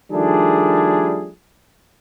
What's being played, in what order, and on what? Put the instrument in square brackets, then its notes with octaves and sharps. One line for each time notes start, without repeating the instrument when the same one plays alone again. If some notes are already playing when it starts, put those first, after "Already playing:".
[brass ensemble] D#3 F3 G3 A3 D4 G#4